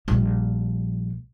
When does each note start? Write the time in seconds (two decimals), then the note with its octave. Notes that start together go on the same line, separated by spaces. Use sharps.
0.08 A#1 G3